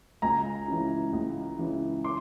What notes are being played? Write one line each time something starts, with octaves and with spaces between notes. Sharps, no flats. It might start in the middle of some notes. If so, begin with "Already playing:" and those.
C#2 G#5 A#5
C#3 E3
C#2
C#3 E3
C6 D6